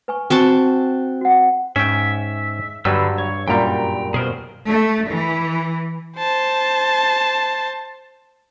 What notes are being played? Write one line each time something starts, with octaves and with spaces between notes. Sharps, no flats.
B4 G#5 C#6
C4 F#4 A5
F#4 F#5
G#2 C#4 E5 G5
G2 D3 F#3 G3 B4 E6
C#5
F#2 A#2 G3 G5 A#5
B2 G#4 A#4 C5
A3
E3
C5 A5